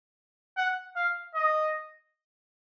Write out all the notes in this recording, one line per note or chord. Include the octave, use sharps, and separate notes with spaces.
F#5
F5
D#5